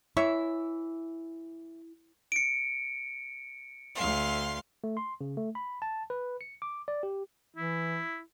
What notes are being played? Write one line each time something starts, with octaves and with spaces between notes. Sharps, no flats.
E3 E4 C#5 E5
C#7 D7
D2 F5 C6
A3
C6
C#3
A3
B5
A5
B4
C#7
D6
D5
G4
E3 E4